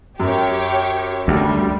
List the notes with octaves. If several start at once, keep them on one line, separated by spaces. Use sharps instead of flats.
F#2 G4 C#5
D2 G3